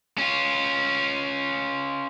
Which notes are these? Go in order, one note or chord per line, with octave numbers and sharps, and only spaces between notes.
C#4 F4